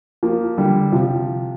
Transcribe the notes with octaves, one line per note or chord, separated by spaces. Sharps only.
F3 A#3
D3 G3
C3 F3